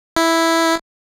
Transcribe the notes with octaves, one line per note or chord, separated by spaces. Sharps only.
E4